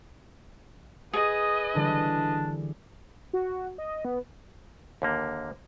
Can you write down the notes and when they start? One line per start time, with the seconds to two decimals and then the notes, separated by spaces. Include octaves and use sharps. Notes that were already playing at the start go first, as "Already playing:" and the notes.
1.13 G#4 B4 D#5 D#6
1.75 D3 E3 G3 D4
3.33 F#4
3.78 D#5
4.05 B3
5.02 D#2 D3 A#3